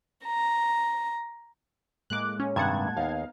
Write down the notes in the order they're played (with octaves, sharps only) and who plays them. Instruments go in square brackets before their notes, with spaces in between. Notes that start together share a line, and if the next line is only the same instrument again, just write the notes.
[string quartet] A#5
[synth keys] A2 G#3 A#3 [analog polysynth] D6 F#6
[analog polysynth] C#4
[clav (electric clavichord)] G2 C3 D#3 [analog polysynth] F#5 A5 G#6
[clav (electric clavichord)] D#2 [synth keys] B3 D#4 F5